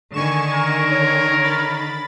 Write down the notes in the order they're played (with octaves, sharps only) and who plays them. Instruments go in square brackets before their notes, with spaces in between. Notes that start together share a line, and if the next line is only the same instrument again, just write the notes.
[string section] D3 D#3 [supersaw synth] G#5 C#6 E7
[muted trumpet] A#4
[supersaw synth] C#5
B5 A6